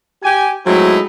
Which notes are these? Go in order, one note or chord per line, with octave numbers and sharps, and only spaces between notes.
G4 G#5
F#3 G#3 A3 C4 D#4 E4